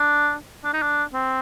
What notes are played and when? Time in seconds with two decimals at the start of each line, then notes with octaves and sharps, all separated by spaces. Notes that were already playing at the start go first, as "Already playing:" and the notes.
Already playing: D4
0.64 D4
0.74 D#4
0.82 D4
1.13 C4